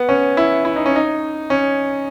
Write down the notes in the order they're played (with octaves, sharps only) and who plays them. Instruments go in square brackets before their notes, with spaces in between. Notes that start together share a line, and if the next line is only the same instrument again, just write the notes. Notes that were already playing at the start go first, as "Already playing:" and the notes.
Already playing: [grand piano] B3
C#4
E4
E4
D#4
C#4
D#4
C#4